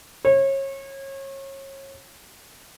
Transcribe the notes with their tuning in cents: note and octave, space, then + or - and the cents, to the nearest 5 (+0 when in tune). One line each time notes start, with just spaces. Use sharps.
C#5 -30